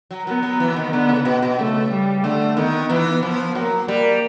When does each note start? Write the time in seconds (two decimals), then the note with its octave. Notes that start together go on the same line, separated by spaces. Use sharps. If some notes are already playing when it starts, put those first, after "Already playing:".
0.11 F#3
0.26 F#3 B3
0.43 F#3
0.60 E3
0.76 D#3
0.93 D3 B3
1.09 C#3
1.25 B2
1.42 B2
1.58 C#3 A3
1.91 G3
2.24 D3 A3
2.57 D#3 B3
2.89 E3 B3
3.23 F3
3.55 F#3 A#3
3.88 G3 A#3